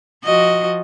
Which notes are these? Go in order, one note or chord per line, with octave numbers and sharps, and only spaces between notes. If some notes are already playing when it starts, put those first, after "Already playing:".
F3 F#4 D#5